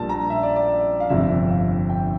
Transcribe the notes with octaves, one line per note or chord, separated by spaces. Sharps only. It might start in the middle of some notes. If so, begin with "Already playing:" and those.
Already playing: A#1 A#2 G3 A5
A#5
E5
D5
D5
F5
G1 F2 C3 E5
F5
G5